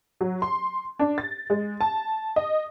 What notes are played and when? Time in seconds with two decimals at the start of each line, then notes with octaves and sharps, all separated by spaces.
0.21 F#3
0.42 C6
0.99 D4
1.18 A6
1.50 G#3
1.81 A5
2.36 D#5